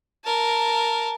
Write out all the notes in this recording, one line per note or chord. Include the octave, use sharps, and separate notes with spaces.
A#4 A5